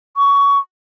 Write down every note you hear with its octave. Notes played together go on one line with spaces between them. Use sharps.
C#6